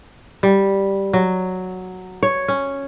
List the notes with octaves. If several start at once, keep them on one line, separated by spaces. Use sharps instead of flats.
G3
F#3
C#5
C#4